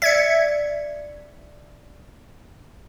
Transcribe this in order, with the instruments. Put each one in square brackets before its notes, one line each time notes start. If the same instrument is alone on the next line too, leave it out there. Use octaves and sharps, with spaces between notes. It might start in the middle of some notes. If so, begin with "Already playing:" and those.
[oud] D5 [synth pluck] E5 G#6 C#7